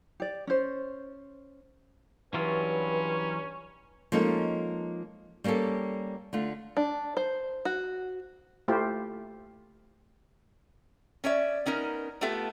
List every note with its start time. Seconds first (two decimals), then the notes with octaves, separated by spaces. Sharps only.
0.20 G4 D5
0.47 C#4 C5
2.34 G2 E3 F#3 G3 C#4 F4 B4
4.12 F3 G#3 A#3 C#4 D#4 A4
5.44 G3 A#3 C#4 G4 A4
6.33 D3 A3 F4
6.77 D4
7.17 C5
7.65 F#4
8.68 A3 E4 F4 G4 C5
11.24 C#4 C#5 D5 E5
11.66 B3 C#4 D#4 A#4
12.21 A3 B3 F4 G4 A4 E5